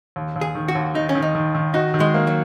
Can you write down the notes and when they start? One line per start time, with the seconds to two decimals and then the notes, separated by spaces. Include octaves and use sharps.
0.16 D#2
0.36 D#2
0.41 G#4
0.55 D#3
0.68 F#4
0.75 D#2
0.94 D#3 D#4
1.09 C#4
1.15 D#3
1.22 D#4
1.35 D#3
1.55 D#3
1.74 D#4 F#4
1.94 D#3
2.00 G#3
2.14 A#3
2.27 F#3